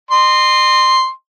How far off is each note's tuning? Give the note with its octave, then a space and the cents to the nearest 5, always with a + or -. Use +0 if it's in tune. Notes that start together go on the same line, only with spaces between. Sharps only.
D#5 -30 C6 +0